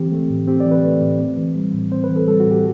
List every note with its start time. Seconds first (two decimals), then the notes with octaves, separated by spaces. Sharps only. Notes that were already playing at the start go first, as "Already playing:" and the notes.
Already playing: E3 C4 G4
0.12 A3
0.30 A2
0.47 C4 G4
0.60 D5
0.66 E3
0.71 B4
0.84 A3
1.02 A2
1.19 C4
1.37 E3
1.56 G3
1.74 A2
1.92 C4 C5
2.04 B4
2.10 E3
2.16 A4
2.28 G3 A4
2.40 F#4
2.46 A2
2.51 G4